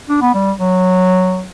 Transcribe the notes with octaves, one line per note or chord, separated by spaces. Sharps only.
D4
B3
G3
F#3